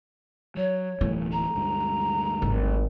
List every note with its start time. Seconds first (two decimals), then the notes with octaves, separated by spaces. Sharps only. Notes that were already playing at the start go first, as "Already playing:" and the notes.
0.57 F#3 C#5
1.01 D1 B1 E3 A3
1.32 A#5
1.55 D2 G2 G#3
2.42 G#1